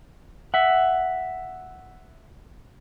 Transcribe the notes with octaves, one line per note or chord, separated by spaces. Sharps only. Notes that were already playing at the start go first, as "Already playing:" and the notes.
E5 F#5